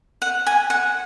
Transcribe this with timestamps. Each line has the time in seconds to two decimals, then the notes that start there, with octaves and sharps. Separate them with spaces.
0.22 F#5
0.47 G#5
0.70 F#5